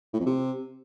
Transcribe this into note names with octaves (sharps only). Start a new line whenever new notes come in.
A2
F2
C3